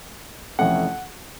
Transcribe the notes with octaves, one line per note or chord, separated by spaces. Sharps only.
F2 C3 E3 A3 C#4 F#5